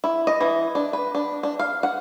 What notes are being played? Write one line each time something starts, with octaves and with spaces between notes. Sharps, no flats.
E4
D#5
E3
D4
B4
D4
D4
F5
F#5